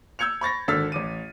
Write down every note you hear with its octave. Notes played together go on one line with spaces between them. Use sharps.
E6 G6 G#6 C#7 F7
B5 C#6 A6 A#6
G#1 D3 E6 F6 A6 B6
A1 D6 D#7